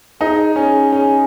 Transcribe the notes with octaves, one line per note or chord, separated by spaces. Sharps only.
D#4 G#4
C#4 G#4
C#4